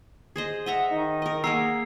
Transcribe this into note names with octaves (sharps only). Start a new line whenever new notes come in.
G#4 C5 D#5
D#5 E5 F#5 A#5
D#3 D#4
A#4 D#5
A#3 G#4 A#4 F#5 A#5 E6 C7